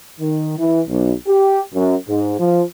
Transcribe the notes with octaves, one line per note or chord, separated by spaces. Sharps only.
D#3
E3
B1
G4
F#2
G#2
F3